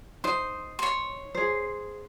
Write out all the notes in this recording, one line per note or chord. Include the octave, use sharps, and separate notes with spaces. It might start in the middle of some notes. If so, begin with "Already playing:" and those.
D#4 C5 C6
C#5 C6
G#4 C5